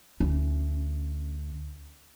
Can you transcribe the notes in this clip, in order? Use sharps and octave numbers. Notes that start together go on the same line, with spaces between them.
D2 C#4